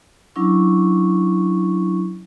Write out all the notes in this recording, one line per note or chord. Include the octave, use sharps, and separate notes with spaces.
F#3 C#4 D4 E4 C#6